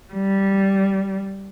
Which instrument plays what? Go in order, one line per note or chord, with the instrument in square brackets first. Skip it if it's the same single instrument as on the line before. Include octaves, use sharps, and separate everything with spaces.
[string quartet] G3